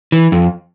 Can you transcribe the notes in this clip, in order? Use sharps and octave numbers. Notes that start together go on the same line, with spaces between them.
E3
F2